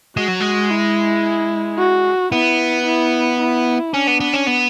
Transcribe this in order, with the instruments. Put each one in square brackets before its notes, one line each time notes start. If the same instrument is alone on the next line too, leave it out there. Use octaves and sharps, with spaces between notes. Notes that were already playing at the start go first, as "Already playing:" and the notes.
[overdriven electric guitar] G#3 [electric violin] F#4
[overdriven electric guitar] F#3
G#3
[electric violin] E4
F#4
[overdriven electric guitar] B3 [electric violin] E4
[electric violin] E4
E4
[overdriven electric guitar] C#4 [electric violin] D4
[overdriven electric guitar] B3
B3
C#4
B3